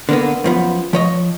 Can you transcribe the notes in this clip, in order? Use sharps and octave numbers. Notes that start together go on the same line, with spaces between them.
D3 A#3 B3
F#2 F3 B3
F3 C#5 D#5